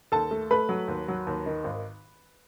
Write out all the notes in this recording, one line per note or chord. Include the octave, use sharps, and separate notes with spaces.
D#2 A4 A5
A3
A3 B4 B5
F#3
D#2
F#3
D#2
D#3
G#1